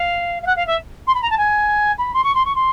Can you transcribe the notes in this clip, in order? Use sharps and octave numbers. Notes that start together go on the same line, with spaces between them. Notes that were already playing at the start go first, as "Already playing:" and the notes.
Already playing: F5
F5
F#5
F5
E5
C6
B5
A#5
A5
G#5
B5
C6
C#6
C6
C#6
C6